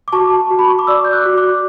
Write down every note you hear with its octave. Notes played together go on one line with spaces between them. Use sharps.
D6
F#4 A5 C#6
F#4
B5
C#6
D6
D5 C#6 E6
G6
D6 F#6
F#4
D6 F#6